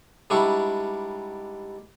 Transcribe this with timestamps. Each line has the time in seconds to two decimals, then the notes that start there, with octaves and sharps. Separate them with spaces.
0.30 G#2 G3 D4 E4 C#6